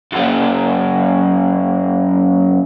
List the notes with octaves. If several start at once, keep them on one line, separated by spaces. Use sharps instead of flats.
F#2 A#3